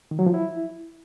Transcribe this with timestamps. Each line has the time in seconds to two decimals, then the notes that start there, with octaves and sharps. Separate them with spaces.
0.11 D#3
0.19 F#3
0.26 F3
0.34 E4